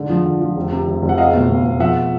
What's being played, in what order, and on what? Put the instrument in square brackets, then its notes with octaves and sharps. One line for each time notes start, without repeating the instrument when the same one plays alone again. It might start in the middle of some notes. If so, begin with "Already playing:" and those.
Already playing: [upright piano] G#2 D3
F3
D3
F3
F1
C3
F1
F1
F#5
C#2 D#5 F5
B2
B2
B2
F3 E5 F#5